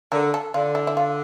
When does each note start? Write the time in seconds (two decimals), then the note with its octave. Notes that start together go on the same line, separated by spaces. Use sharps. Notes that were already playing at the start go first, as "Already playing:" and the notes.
0.12 D3 A#4
0.34 A4
0.54 D3 F4
0.75 E4
0.87 E4
0.97 F4